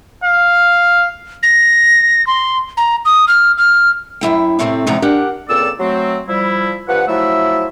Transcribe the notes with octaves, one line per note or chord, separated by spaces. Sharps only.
F5
A#6
C6
A#5
D#6
F6
F6
F#2 E3 E4 G5
A2 C3 A3 A#3 C4
E2 G#2 C3 F3 D#4 A#5
D4 G4 A#4 F#5
C#2 A#2 C4 A4 D5 E6
F#3 A3 C4
F3 G3 E4
G2 F3 B4 F#5
F3 F#3 A3 E4 E5